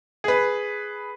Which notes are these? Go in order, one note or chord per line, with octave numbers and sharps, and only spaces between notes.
G#4 B4